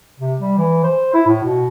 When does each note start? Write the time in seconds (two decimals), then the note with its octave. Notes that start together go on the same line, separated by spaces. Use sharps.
0.20 C3
0.40 G3
0.58 E3
0.84 C5
1.14 E4
1.27 A2
1.44 B2